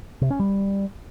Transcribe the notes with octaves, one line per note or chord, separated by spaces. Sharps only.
C3
C#4
G3